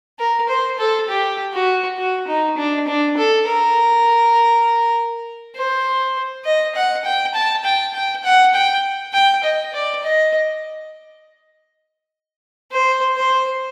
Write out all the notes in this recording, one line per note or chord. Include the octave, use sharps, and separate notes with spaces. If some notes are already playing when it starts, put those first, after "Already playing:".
A#4
C5
A4
G4
F#4
F#4
D#4
D4
D4
A4
A#4
C5
D#5
F#5
G5
A5
G5
G5
F#5
G5
G5
D#5
D5
D#5
C5
C5